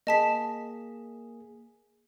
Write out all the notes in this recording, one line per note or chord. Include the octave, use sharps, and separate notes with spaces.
A#3 G#4 D#5 A5 B6